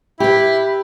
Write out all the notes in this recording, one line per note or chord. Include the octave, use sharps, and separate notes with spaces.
E4 G4 B4